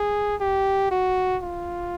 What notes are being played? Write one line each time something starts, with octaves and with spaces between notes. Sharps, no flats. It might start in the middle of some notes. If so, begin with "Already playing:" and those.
Already playing: G#4
G4
F#4
F4